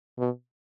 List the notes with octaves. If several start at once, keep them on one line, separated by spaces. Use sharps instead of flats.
B2